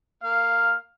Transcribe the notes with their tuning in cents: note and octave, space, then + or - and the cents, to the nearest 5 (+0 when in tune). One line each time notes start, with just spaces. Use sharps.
A#3 -20 F5 +0